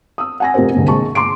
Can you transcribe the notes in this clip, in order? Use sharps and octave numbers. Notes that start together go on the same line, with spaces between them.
D#6 E6
F#5 G#5 A#6
F1 F2 G4 A#4 C5
C2 D3 G#3 A#3
A#1 G#3 A5 C#6
C6 D6 D7